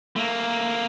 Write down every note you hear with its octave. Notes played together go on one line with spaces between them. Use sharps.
A3 A#3